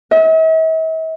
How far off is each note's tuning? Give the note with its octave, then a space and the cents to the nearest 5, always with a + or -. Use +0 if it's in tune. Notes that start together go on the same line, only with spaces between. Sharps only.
E5 -45